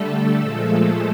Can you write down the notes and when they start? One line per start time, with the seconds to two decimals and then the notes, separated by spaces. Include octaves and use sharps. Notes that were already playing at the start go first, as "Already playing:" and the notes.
Already playing: D3 G3 A3 A4
0.40 A#2 F3 G#3